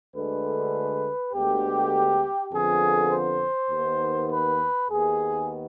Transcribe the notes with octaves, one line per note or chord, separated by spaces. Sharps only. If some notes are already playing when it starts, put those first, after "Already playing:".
D2 D3 G#3 B4
D2 D3 G#3 B3 G4
F2 D3 F3 B3 G#4
C5
D#2 D#3 B3
B4
D#2 D#3 B3 G#4